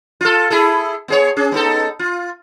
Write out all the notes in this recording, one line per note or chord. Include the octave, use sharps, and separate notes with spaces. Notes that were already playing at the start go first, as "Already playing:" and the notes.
F4 A4
E4 G#4 A4
B3 G#4 C#5
C#4 G#4
B3 D#4 A4
F4